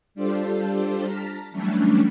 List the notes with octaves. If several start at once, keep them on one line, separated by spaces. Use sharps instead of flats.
G3 D4 F4 G4 A4 C5
A5 A#5 F6 B6
E3 F#3 G3 A3 C#4 D4